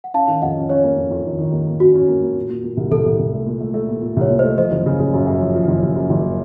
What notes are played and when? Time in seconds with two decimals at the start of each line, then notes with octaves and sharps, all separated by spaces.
0.04 F#5
0.14 C#4 F5 A5
0.28 D#3
0.42 F2 D#5 F#5
0.56 C#4
0.69 C#4 C#5 F5
0.84 A#3
0.97 F2
1.11 F2
1.25 D#3
1.39 D#3
1.52 A#3
1.67 A#3
1.80 C#4 F#4
1.94 C#4
2.08 A#3
2.22 A#3
2.37 A#2
2.49 A#2
2.64 A#2
2.77 C2
2.91 C2 A4
3.06 C2
3.19 C2
3.33 A3
3.46 A#2
3.61 A3
3.74 A3
3.89 A#2
4.02 A#2
4.17 C2 C#5
4.30 A#2
4.39 A3 C5 D#5
4.58 F3 C5 D#5
4.72 F#1
4.86 C#3
5.00 C#3
5.13 F#2
5.26 F#2
5.41 F3
5.55 F3
5.68 F#1
5.83 F#1
5.96 F#2
6.10 F#1